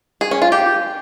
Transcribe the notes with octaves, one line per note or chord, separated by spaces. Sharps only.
G#4
C#4
F4
G4